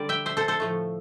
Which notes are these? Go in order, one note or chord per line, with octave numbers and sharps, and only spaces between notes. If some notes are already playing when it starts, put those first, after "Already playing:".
Already playing: D3 G3 D5
E5 G5
C5 E5
A4 C5
A4 C5
A2 F3 A3